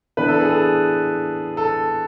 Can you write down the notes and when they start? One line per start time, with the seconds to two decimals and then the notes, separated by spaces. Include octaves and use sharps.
0.17 E3 B3 D4 B4
0.28 A4
0.40 G#4
0.51 A4
1.57 A4